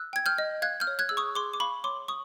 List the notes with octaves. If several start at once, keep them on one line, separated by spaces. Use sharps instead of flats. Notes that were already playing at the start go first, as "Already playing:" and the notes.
Already playing: E6 F#6
G5 G#6
F6 G6
D#5
F5 F#6 G#6
F6 G6
C#5
F#6 G#6
G#4 E6
C#6 D#6
G#4 C6 D6
D6
F5 B5 C#6
C#5 C6 D6
C#6 D#6